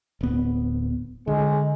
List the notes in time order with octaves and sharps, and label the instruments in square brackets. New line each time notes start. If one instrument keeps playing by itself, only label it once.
[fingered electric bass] D1 B3
[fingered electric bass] D3 [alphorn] G#3